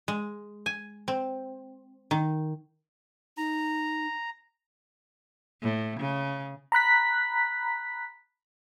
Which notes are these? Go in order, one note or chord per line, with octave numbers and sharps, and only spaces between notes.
G#3
G#5
C4
D#3
D#4 A#5
A2
C#3
A#5 B5 F#6 B6